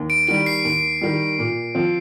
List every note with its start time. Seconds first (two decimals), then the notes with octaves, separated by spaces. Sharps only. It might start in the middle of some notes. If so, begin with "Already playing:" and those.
Already playing: D#2
0.10 D7
0.28 D#3 G3 D7
0.46 C7
0.65 D#2
1.01 D#3 G3
1.39 A#2
1.75 F3 C4